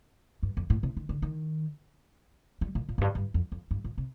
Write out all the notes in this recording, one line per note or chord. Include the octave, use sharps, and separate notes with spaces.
G2
F2
A2
C3
D#3
D3
D#3
G3
A#2
A#2
F2
G2
G2
F2
F2
G2
A#2
C3